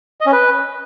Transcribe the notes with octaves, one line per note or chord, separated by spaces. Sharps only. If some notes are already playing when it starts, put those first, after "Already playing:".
D#5
C#4
B4